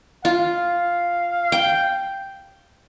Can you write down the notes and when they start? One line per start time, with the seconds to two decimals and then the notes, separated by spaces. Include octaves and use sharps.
0.25 F4 F5
1.52 G5